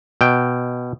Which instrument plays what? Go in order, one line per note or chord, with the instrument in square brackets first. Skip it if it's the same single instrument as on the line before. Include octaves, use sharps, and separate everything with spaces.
[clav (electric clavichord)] B2 G5